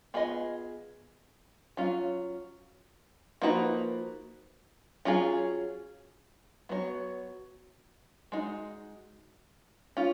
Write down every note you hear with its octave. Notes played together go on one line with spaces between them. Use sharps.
B3 F4 G#4 B4 D#5
F#3 C#4 F4
F3 A#3 D#4 F#4 B4
F#3 C#4 F4 G#4
F#3 B3 F#4 C#5
G#3 D#4 F#4
C#4 F4